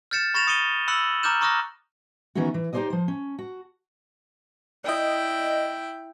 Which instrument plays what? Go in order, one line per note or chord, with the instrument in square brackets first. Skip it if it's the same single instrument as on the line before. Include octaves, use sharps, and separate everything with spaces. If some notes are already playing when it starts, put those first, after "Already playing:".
[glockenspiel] F6 G6 A6 C#7 E7
B5 C#6 A6 A#6 E7 F7
D#6 C#7 D#7 G7
B5 E6 F#6 C#7 F#7
A#5 D6 F6 G6 E7
A#5 C#6 D#6 F6 F#6 A#6
[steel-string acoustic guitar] D#3 E3 B3 C#4 E4 F#4
E3
D#4 G4 G#4 C5 D5 D#5
F3 C5
C#4
F#4
[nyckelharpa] E4 G5 [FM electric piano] D5 D#5